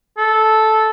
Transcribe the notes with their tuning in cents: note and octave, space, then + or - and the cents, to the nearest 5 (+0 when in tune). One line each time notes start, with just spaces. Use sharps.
A4 -10